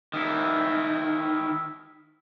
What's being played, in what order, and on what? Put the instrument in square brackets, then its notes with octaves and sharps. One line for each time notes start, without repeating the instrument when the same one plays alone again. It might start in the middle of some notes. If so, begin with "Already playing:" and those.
[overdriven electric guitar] D#3 E4